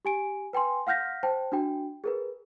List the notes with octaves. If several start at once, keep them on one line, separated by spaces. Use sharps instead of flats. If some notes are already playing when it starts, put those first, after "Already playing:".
G4 G#5 D7
B4 G5 G#5 C6
F5 F#5 F6 G6 A#6 B6
C5 G5 A5
D4 F#4 G5
G#4 A#4 B4